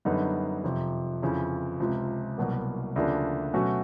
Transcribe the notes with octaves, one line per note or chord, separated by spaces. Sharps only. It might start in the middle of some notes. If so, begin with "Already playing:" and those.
F#2 D3 G3 B3 D#4
F2 C3 F3
F2 C#3 E3
C#2 C3 F3
C2 B2 F#3 A#3
D2 C#3 F3 A#3 D4
B2 F#3 A3 C#4 F#4